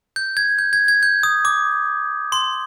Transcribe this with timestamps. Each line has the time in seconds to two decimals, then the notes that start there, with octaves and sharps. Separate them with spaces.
0.16 G6
0.37 G#6
0.59 G6
0.73 G#6
0.88 G#6
1.03 G6
1.23 D#6
1.45 D6
2.32 C6